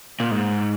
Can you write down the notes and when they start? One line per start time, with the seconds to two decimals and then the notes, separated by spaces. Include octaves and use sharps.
0.20 A#2
0.31 G#2